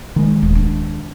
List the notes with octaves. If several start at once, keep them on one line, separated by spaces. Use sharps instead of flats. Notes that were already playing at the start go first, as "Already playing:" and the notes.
D#3 G#3
D#1
D4